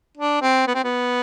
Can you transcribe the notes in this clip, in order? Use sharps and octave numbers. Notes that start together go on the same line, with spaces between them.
D4
C4
B3
C4
B3